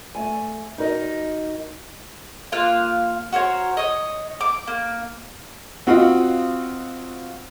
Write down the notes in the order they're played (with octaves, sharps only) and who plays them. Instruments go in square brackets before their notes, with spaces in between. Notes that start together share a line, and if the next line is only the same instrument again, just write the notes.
[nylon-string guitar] A3 G#5
D#4 F#4 A#4 D#5
[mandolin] A#3 F4 F5 F#6
F#4 A#4 C5 C#5
C#5 D#5
D6
A#3
[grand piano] C4 F4 F#4 D#5 F5 F#5